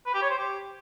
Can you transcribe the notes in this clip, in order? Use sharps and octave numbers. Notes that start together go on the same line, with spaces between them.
B4
G4
C#5
C5
G4